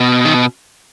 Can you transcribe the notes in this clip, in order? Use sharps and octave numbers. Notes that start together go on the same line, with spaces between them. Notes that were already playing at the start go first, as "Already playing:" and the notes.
Already playing: B2
D#3